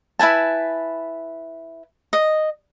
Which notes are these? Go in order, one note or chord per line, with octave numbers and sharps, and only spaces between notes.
E4 B4 G#5 A5
D#5